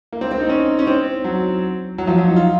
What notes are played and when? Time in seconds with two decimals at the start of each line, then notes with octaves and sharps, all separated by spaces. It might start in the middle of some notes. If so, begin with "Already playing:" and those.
0.12 A#3
0.21 C4
0.31 C4
0.40 D#4
0.49 C#4
0.71 D#4
0.79 C#4
0.87 C4
1.24 F#3
1.98 F#3
2.07 F3
2.18 F#3
2.27 D#4
2.36 F4